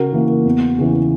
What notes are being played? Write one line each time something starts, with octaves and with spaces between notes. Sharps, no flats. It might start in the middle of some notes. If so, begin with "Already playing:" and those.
Already playing: C#3 F#4 A#4
E3 A#3
E2
C#3 E3